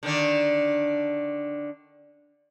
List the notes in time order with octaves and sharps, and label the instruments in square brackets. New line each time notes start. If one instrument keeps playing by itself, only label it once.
[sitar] D3 D#3 D4